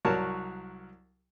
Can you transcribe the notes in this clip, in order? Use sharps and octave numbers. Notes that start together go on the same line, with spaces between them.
C2 F#3 F#4 A#4 C#5 A5